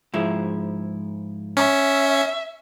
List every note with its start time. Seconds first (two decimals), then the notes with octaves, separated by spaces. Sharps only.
0.14 G#2 F3 E4
1.57 C#4 E5